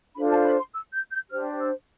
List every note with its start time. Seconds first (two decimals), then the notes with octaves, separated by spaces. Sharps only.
0.16 D4 F4 A4 C5 B5
0.30 A5
0.45 B5
0.59 C6
0.73 E6
0.92 G6
1.11 G6
1.31 D4 G4 C5 F6
1.59 E6